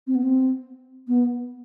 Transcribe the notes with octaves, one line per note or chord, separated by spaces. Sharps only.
C4
B3
C4
B3